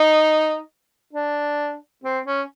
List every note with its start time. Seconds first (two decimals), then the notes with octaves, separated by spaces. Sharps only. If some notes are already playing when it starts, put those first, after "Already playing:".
Already playing: D#4
1.13 D4
2.04 C4
2.26 C#4